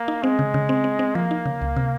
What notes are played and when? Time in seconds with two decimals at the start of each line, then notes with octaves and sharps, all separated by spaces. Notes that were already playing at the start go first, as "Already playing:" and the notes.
Already playing: A#3
0.08 D#4
0.23 G#3 C4
0.39 C#3
0.54 C#3
0.69 C4
0.84 C4
0.99 C4
1.15 F3 A#3
1.31 D#4
1.46 C#3
1.62 C#2
1.76 C3